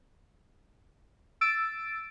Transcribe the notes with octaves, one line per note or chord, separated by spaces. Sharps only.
E6 A6 D7